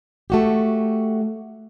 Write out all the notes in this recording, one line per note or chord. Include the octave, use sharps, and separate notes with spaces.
A3 F#4 G4